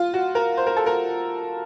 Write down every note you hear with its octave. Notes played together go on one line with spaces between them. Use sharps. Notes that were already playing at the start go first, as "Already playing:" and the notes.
Already playing: F4
F#4
A#4
C5
A#4
A4
A#4